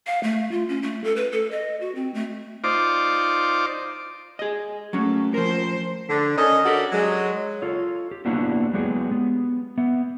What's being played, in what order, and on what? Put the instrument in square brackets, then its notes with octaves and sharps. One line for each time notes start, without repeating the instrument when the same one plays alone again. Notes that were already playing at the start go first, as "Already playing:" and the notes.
[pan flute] F5
A3
F4
C#4
A3
A4
B4
A4
D#5
F#4
C4
A3
[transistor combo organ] D#4 F4 C5 D5 D6
[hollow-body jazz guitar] G#4 D#5
[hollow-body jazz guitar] F#3 C#4 [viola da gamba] A3 A#3
[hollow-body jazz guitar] F3 A#4 [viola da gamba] C5
[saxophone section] D3
D#3 C#4 A4 D#5
D4 F#4 G4 A4 A#4 D5
F#3 G#3
[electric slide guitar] F4 A4 C#5
G4
A#3 B3 D4 E4 F#4 G4
F#3 G#3 B3 G4 G#4
B3
B3 E5